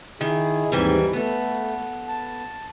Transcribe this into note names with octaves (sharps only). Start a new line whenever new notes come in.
D#3 E4 G#4
D#2 G#2 D#3 E3 G3 C4
A3 B3 A4
A5